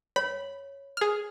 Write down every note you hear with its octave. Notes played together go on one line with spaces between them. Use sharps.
C#5 B5
G#4 F6